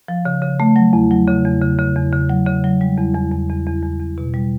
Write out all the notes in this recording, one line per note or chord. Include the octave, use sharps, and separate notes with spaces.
F3
C#3
C#3
A3
F#3
E2
F#3
C#3
E2
C#3
C#3
E2
C#3
F#3
C#3
F#3
G3
E2
E2
E2
E2
E2
E2
E2
B2
G3